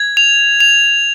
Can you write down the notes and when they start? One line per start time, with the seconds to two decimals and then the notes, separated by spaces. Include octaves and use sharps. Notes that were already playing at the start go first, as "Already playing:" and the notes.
Already playing: G#6
0.17 F7
0.60 F7